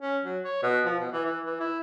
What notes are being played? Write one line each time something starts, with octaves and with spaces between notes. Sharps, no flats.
C#4
F#3
C#5
B2
F3
B2
E3
E3
E3
E4